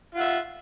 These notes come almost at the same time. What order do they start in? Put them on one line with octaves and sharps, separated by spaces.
F4 F#5 E5